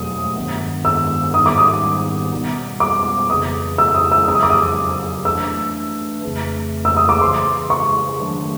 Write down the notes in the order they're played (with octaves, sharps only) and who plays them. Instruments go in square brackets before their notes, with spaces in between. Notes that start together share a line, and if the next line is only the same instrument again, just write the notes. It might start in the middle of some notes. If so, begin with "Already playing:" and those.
Already playing: [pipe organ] E2 B2 F#3 A3 [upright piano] D#6
[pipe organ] G2 D#3 G#3 B3
[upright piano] E6
[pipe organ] G#2 D#3 G3 B3 D#4 [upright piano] D#6
[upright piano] D6
D#6
[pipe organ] B2 G3 B3
[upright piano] D6
[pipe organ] F2 C#3 E3 G#3 [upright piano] D#6
[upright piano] E6
D#6
E6
[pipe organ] E2 C#3 F#3 [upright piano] E6
[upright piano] D#6
D6
D#6
[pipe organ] E3 A3 D4 [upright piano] E6
[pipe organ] F2 C#3 E3 A3
[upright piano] E6
D#6
D6
[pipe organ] C#3 E3 G#3 [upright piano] C6
[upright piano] C#6
[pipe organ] D#3 F#3 A3 D4